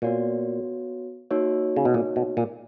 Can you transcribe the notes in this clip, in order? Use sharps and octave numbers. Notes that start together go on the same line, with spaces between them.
A#2 B3 F#4 C#5
A#3 D#4 F#4 C#5
C#3
B2
A#2
B2
A#2